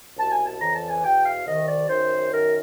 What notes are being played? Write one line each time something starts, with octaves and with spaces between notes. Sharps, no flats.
C2 B2 A5
G#5
A5
F2 C#3 E3 A#5
A5
G#5
E2 B2 G5
F5
C2 C3 D#3 D#5
D5
F#2 D#3 C5
F#2 D#3 A#4